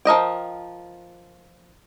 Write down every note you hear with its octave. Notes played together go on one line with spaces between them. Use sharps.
F3 A#4 D#5 G5